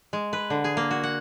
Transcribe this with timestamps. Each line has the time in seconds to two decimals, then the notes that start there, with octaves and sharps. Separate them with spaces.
0.13 G#3
0.33 B4
0.50 D3
0.64 G#4
0.77 A#3
0.91 F#4
1.04 F#5